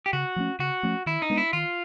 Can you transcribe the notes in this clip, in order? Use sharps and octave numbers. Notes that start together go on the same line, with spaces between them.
G4
C#3 F#4
F3 A3 C#4
C#3 F#4
F3 A3 C#4
D#3 E4
D#4
G#3 B3 D4
E4
D#3 F4